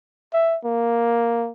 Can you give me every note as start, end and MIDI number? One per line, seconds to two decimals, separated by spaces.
0.34 0.58 76
0.64 1.51 58